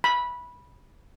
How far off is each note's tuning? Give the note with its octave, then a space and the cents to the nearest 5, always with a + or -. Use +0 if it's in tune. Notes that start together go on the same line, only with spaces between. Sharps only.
B5 -15